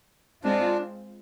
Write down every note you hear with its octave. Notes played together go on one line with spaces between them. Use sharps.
G#3 C4 D4 F4